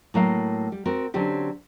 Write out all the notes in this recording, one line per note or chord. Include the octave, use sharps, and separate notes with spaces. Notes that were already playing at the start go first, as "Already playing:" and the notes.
A2 F#3 A#3 F5
G3
C4 F#4 A#4
D3 F#3 C4 C#4 G4